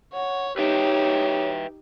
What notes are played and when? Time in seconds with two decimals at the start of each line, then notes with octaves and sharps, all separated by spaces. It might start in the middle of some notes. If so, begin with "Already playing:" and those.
0.13 C#5 F#5
0.58 D#4 G4 B4 C#5 E5 G5